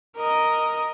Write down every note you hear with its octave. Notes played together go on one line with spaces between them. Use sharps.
A#4 D#5